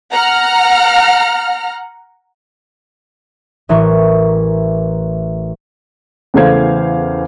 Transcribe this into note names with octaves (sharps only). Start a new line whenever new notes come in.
F#5 A#5 F6
A1 E3 A#4 C#6
E2 C#3 A3 C5 F5 G#6